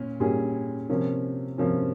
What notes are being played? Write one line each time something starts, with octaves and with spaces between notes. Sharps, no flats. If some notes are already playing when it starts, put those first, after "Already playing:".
Already playing: A#2 C#4
A#2 G3 C#4 G#4
C3 F3 A#3 C#4
C3 F3 A#3 C#4